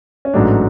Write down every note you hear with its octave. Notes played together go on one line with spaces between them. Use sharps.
C#4
A1 G#2 F#3 A3 D4